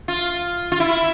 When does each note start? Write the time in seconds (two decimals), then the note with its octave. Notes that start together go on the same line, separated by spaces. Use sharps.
0.08 F4
0.72 F4
0.80 E4